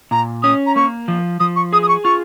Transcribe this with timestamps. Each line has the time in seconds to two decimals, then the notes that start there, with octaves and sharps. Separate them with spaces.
0.11 A#2 A#5
0.43 C#4 D#6
0.66 A#5
0.76 A#3 C#6
1.08 F3
1.40 F3 D#6
1.56 C#6
1.73 G#4 D#6
1.83 D#6
1.88 C#6
2.04 F4 C#6